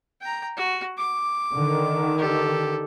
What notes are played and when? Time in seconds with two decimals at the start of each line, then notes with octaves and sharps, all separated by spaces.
0.21 G5 A#5
0.57 F#4
0.98 D6
1.52 D3 D#3
2.18 G4 A4